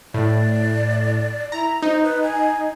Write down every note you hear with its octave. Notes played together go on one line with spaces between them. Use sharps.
A2 D5
E4 A#5
D#4 C5
B4
G#5